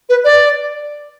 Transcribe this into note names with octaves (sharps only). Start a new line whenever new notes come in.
B4
D5